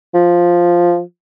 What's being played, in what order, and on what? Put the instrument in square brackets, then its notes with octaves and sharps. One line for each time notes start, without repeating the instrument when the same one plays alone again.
[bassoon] F3